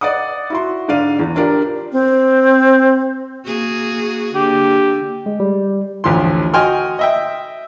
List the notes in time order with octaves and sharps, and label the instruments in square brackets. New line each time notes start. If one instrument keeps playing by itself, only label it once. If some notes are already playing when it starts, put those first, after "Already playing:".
[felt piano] D5 D#5 F#5 D6 D#6
E4 F#4 C6
G#2 D3 D5 F5 D#7
E2
D4 F4 G4 A#4 D5
[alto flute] C4
[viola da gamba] A#3 F#4 G#4
[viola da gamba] D3 A#3 [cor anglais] G4
[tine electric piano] G#3
G3
[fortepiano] A1 D2 F3 C6
F#4 D#5 G5 G#5 C6 F6
D#5 E5 G5